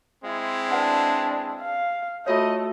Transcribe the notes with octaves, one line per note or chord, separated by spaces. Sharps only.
G#3 C4 E4
D4 B4 F#5
F5
A3 F4 F#4 C#5 D#5